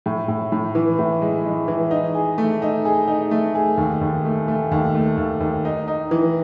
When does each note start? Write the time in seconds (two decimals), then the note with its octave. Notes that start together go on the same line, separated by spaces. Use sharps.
0.06 A2
0.28 A2
0.52 A2
0.75 E3
0.99 A2
1.22 G#3
1.45 G#3
1.68 E3
1.91 D#4
2.15 G#4
2.38 A3
2.62 D#4
2.85 G#4
3.08 D#4
3.31 A3
3.55 G#4
3.77 D#2
4.01 D#2
4.25 A3
4.48 A3
4.72 D#2
4.95 A3
5.18 D#2
5.40 D#2
5.65 D#4
5.88 D#4
6.11 E3